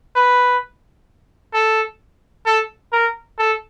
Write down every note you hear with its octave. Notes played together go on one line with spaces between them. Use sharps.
B4
A4
A4
A#4
A4